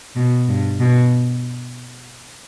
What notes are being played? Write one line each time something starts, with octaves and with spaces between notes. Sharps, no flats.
B2
G2
B2